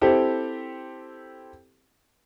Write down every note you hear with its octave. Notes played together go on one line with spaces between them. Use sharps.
C4 E4 G4 A4